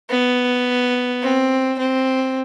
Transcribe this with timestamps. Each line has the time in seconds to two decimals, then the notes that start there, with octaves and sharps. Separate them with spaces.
0.10 B3
1.22 C4
1.79 C4